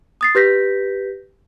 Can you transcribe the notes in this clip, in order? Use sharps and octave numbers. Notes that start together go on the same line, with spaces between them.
D#6 A6 C7
G4 B4 G6 A#6 B6